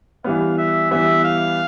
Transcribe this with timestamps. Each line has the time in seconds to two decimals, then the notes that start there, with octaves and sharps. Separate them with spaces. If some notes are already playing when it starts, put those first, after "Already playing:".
0.24 E3 G3 B3 F5
0.58 E5
0.91 E3 G3 B3 E5
1.24 F5